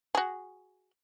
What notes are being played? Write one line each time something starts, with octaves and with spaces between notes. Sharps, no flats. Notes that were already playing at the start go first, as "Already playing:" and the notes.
F#4 G#4